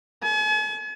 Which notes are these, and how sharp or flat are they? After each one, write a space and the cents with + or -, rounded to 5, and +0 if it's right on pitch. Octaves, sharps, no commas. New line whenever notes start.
G#5 +45